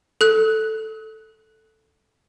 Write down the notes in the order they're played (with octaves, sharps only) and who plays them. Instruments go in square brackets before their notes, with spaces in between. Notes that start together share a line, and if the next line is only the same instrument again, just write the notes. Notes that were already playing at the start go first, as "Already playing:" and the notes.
[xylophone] A4 F#6